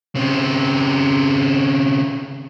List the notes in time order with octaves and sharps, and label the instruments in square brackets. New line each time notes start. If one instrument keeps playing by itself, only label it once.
[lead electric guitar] C#3 C4